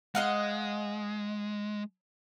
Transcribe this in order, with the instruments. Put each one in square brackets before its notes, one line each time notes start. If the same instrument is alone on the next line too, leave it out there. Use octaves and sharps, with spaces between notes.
[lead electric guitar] G#3 [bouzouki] D#5 F5 F#5